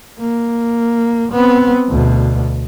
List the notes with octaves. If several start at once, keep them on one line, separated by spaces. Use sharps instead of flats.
A#3
B3 C4
D2 B2